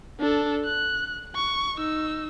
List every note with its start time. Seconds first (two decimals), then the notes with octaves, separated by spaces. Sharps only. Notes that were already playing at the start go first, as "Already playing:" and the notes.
0.19 D4 A4
0.65 F#6
1.35 C#6
1.77 D#4 E6